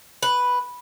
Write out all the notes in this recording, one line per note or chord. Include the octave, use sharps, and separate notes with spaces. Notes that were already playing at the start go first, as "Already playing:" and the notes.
B4